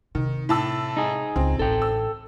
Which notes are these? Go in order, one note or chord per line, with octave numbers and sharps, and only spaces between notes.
C3 D#3
A2 A5 E6
D#4 G#4
C#2 C4
A1 A4 G5
E6